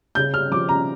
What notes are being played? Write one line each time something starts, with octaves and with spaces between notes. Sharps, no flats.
C#3 G6
F6
F3 D6
A#5